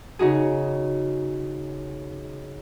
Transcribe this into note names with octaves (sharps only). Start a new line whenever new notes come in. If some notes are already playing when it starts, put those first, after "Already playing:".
C#3 D#4 F#4 G#4